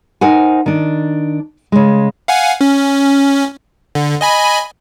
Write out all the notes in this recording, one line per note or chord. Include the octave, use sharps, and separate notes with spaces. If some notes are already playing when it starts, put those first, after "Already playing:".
D#4 A#4 C5 F#5 G#5
D#3 D4
C#3 G#3
F5 F#5 G#5
C#4
D3
D#5 G#5 B5